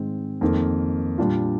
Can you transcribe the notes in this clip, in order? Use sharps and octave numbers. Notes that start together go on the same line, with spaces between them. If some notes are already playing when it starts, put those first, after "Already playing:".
Already playing: G#2 D#3 G#3 C4
F2 D#3 A#3
A#2 G3 D4 F4